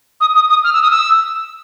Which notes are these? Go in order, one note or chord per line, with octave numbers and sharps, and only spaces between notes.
D#6
D#6
D#6
F6
E6
D#6
E6